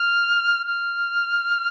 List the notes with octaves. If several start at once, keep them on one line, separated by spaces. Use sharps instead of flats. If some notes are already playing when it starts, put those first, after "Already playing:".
Already playing: F6
F6